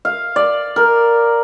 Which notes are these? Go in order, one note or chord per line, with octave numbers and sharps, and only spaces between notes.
F5
D5
A#4